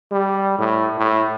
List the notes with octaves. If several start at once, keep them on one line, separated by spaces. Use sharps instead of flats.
G3
A2
A2